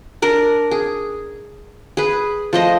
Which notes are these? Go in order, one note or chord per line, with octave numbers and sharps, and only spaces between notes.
D4 A#4 A#5
G#4
G#4 B4
F3 A3 C5 D#5